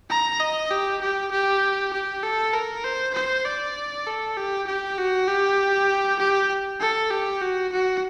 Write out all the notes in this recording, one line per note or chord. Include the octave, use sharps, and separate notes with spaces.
A#5
D#5
G4
G4
G4
G4
A4
A#4
C5
C5
D5
A4
G4
G4
F#4
G4
G4
A4
G4
F#4
F#4